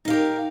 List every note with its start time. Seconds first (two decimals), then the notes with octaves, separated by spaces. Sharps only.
0.05 D#4
0.08 F5
0.10 G4
0.13 A#4